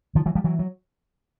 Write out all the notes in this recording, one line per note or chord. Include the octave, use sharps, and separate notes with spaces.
D#3 F3
E3 F#3
F3 G3
E3 F#3
F#3